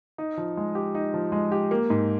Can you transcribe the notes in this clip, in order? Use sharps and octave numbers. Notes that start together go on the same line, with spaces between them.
D#4
F3
G#3
G4
D#4
F3
G#3
G4
A#3
G#2